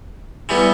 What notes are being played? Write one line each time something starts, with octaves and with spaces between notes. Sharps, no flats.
E3 G3 B3